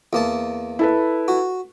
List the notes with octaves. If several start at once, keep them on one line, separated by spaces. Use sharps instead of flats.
E2 A#3 A5
E4 A4 B4
F#4